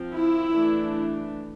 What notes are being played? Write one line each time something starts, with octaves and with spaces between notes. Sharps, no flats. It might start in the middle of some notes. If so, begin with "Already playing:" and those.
Already playing: F3 C4
E4
E3 A3 D4